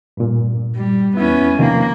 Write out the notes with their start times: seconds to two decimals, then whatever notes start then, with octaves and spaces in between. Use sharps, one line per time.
0.17 G2 A#2
0.76 G3
1.17 E2 B3 C#4 E4
1.59 C3 D#3 F3 A#3